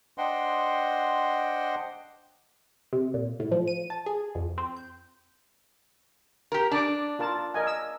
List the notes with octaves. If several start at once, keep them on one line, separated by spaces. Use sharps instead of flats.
D4 C5 D#5 F#5 G5 C6
C3
A#2
A2
F3
D#7
A5
G#4
F2
C4
G6
G4 A#4
D4 D5 D6
F4 A#4 A5
A#4 D#5 G#5
E6